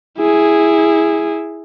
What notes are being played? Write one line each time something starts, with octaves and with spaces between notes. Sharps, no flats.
E4 G#4